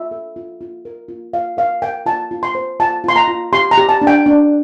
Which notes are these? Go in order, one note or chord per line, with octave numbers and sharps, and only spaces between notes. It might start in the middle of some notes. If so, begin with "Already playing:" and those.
Already playing: F4 E5
A4
F4
F4
A#4
F4
F4 F5
A#4 F5
A#4 G5
F4 A5
F4
C6
C5
F4 A5
F4 C6
A#5
F4
G4 C6
A#5
G4
A5
D4
G5
D4